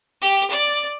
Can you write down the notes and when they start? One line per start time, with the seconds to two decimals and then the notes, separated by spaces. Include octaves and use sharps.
0.21 G4
0.50 D5